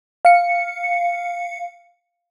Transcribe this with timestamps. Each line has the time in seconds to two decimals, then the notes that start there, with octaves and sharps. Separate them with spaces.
0.25 F5 C#7